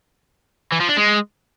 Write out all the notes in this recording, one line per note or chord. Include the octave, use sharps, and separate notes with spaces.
E3
F3
D4
G#3